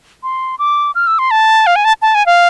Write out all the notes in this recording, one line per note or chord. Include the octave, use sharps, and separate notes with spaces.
C6
D6
F6
E6
C6
A5
F5
G#5
A5
A5
G#5
F5